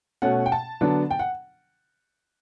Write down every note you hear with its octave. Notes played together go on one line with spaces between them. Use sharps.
B2 A3 C#4 F#5
G5
A5
D3 F#3 B3 D4
G5
F#5